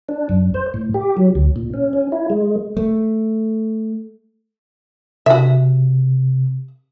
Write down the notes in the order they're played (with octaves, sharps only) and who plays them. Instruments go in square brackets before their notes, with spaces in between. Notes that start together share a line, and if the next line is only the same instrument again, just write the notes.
[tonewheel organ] D4
F#2
C5
A2
G4
F#3
D2
A#2
C#4
C#4
E4
G#3
[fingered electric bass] A3
[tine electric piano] C3 [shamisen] F#4 E5